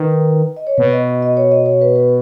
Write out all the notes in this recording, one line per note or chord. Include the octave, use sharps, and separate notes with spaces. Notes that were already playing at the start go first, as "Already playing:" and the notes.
Already playing: D#3 B4
D#5
C#5
B2 B4
D#5
D#5
D#5
C#5
D#5
C#5
B4
B4